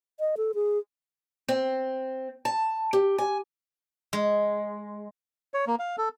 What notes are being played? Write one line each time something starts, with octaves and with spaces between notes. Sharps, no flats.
D#5
A4
G#4
C4
A5
G4
G#5
G#3
C#5
A#3
F5
A4